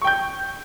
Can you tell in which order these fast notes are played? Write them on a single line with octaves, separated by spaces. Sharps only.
C#6 G5 G6